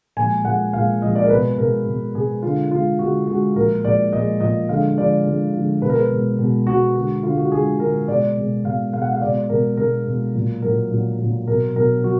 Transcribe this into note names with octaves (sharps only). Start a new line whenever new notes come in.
A#2 F3 G#3 G#5
A#2 F3 G#3 F#5
A#2 F3 G#3 F5
A#2 F3 G#3 D#5
D5
A#4
B2 G#3 B4
B2 G#3 A#4
B2 G#3
B2 G#3 G#4
D3 G#3 F4
D3 G#3 F4
D3 G#3 F#4
D3 G#3 F#4
A#2 F3 G#3 A#4
A#2 F3 G#3 D5
A#2 F3 G#3 D#5
A#2 F3 G#3 D#5
D3 F3 G#3 F5
D3 F3 G#3 D5
D3 F3 G#3
D3 F3 G#3
B2 G#3 A#4 B4
B4
B2 G#3
B2 G#3
B2 G#3 F#4
D3 G#3 F#4
D3 G#3 F4
F#4
D3 G#3 G#4
D3 G#3 A#4
B2 G#3 D5
B2 G#3
B2 G#3 F5
B2 G#3 F5
F#5
F5
B2 G#3 D5
B2 G#3 A#4
B2 G#3 A#4
B2 G#3
A#2 F#3
A#2 F#3 A#4
A#2 F#3
A#2 F#3
B2 F#3 A#4
B2 F#3 A#4
F#3 F#4